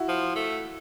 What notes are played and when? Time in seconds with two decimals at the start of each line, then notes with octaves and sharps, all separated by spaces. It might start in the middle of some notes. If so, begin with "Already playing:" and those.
Already playing: E4 F#4
0.09 F3
0.35 A3